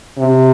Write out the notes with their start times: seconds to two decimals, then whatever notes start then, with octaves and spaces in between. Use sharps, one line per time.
0.19 C3